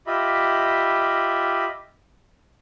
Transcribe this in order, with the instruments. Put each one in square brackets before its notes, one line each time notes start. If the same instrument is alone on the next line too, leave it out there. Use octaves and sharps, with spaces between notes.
[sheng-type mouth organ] F4 G4 D#5 E5 B5